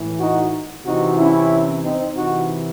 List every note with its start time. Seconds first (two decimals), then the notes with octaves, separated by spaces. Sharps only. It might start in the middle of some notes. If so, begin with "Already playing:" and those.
Already playing: A2 E3
0.19 D#4 F#4
0.85 C3 E3 D#4 F#4
1.18 C#4 E4
1.84 C4 D#4
2.17 C3 E3 D#4 F#4